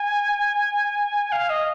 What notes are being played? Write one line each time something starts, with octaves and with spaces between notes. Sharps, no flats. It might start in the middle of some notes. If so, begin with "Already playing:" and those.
Already playing: G#5
F5
D#5